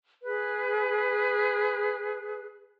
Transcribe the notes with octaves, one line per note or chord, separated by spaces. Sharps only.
G#4 B4